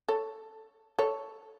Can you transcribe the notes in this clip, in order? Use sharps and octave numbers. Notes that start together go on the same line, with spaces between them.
A4 C#5
A4 C#5